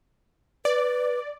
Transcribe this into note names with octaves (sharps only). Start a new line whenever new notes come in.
B4 D5